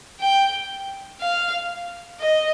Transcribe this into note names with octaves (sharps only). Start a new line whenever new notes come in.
G5
F5
D#5